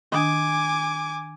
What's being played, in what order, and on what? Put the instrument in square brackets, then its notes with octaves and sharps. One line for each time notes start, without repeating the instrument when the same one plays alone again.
[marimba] D#3 D4 D#6 [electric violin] G#5 D6